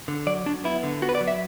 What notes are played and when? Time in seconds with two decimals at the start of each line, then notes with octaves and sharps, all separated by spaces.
0.08 D3
0.27 F#3 D5
0.46 F#3 D4
0.64 B3 E4
0.83 D3
1.02 B3 F#4
1.09 B4
1.15 D5
1.21 F#3
1.28 E5